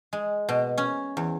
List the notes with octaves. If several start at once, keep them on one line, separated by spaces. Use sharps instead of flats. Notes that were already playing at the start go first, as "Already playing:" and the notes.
G#3
B2
C#4
E2